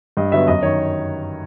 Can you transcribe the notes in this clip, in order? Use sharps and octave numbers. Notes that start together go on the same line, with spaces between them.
G2 D#5
D3 F#3 B3 E5
F#2 D#5
D#3 C#5